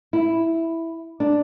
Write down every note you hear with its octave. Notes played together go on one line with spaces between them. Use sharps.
E4
D4